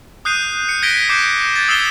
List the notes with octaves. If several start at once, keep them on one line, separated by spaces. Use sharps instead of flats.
D#6 F#6 G6 C7 D#7
C#7
F#6 G#6 A#6 B6 D7 G7
D6 G6 C7
G#6 A6
D#6 E6 C7 C#7 E7 G7